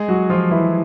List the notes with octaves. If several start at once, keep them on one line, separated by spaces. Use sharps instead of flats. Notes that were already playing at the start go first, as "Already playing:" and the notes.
Already playing: G#3 G#4
F#3 F#4
F3 F4
E3 E4